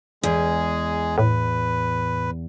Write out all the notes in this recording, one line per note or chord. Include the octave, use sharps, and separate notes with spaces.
E2 G#3 G#4
A2 B4